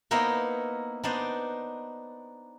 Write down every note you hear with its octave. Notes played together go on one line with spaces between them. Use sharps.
A#3 B3 D#4 E4 A#4 C5
B3 D4 D#4 C5 D5